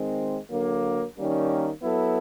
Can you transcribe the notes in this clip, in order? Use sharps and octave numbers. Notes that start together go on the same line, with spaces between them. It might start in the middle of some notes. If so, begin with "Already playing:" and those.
Already playing: D#3 G#3 C4
D3 F#3 A#3
D#3 G3 A#3 C#4
F#3 B3 E4 A4